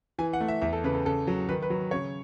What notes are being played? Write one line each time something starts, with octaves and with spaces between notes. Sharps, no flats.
E3 G#5
F#5
A3
E5
E2 E5
A4
C#3 B4
A4
C#3 A4
F#3
D#3 B4
B4
F#3
C#3 C#5